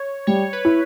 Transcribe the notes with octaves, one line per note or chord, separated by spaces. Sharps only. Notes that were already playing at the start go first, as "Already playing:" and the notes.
Already playing: C#5
G3 C#5
B4
E4